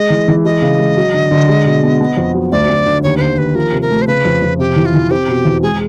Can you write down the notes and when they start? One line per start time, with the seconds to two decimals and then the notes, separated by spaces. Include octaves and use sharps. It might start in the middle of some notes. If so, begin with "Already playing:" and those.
Already playing: G#3 D#5
0.10 E3
0.28 E3
0.45 G#3 D#5
0.62 C#3
0.79 G#3
0.97 F#3
1.14 D3
1.31 D3
1.49 G#3
1.65 B2
1.83 B3
2.01 B3
2.17 F2
2.34 F#3
2.52 D2 D5
2.69 D2
2.86 D3
3.03 D#2 C#5
3.17 B4
3.21 D#2 C5
3.38 D#2 B4
3.55 F3 A#4
3.72 C3
3.82 A#4
3.90 A3
4.02 C5
4.07 C#3 B4
4.25 F2
4.42 F2
4.59 C3 G4
4.76 E3
4.86 F4
4.94 E3
5.11 C4 G4
5.28 B2
5.45 E2
5.62 G#3 G#4